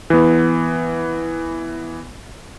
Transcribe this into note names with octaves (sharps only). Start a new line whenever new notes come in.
E3 B3